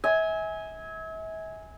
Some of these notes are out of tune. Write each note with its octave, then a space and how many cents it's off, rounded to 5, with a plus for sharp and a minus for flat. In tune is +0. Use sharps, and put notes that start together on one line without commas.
E5 -40 G#5 +0